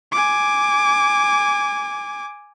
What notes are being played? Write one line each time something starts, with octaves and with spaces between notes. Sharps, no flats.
G#5 D6